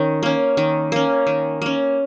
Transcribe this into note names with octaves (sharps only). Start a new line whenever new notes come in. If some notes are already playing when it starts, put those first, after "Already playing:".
Already playing: D#3 C#4
A#3 C#4
D#3
A#3 C#4
D#3
A#3 C#4